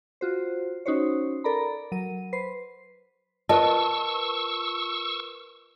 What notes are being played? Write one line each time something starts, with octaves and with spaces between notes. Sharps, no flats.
F4 F#4 C5
C#4 D#4 F#4 C5 C#5
A4 A#4 D5 A#5 B5
F#3 A#4 D#7
B4 C5 C7
F4 A#4 B4 D#5 A5 C#6 E6